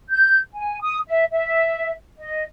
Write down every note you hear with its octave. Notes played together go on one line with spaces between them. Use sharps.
G6
G#5
D#6
E5
E5
D#5